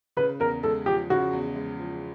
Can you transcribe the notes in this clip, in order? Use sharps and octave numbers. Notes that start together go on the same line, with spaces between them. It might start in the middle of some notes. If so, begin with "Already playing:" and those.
C#3 B4
E2 A#4
G#3 A4
F3 G4
C#3 F#4
E2
G#3
F3